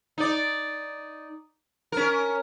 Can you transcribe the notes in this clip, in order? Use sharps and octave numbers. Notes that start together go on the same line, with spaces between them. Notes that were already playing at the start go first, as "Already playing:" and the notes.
D#4 D5
C#4 A#4